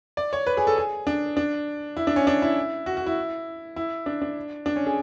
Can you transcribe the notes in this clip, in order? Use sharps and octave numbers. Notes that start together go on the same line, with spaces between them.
D5
C#5
B4
G#4
A4
G#4
D4
D4
E4
D4
C#4
D4
E4
F#4
F#4
E4
E4
D4
D4
D4
C#4
G#4